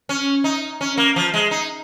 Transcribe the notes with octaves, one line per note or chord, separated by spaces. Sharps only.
C#4
D#4
C#4
A#3
F3
G#3
D#4